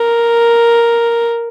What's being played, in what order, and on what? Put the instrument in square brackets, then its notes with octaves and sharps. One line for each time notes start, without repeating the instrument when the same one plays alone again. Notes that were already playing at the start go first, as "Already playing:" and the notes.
Already playing: [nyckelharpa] A#4